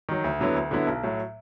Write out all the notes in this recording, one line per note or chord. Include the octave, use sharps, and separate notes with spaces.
D#3 F#3
D2
D3 F#3 B3 E4
D2
D3 F#3 B3 E4
B1
A2 F#3